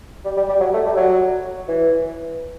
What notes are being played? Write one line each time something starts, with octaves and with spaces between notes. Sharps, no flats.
G3
G3
G3
F#3
A3
G3
F#3
E3